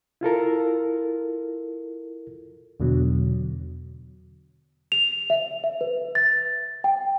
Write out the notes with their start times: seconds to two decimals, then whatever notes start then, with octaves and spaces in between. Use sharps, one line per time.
0.21 E4 F4 A4 A#4
2.80 E2 B2 D3 F#3
4.92 F7
5.30 E5
5.64 E5
5.81 B4
6.15 A6
6.84 G5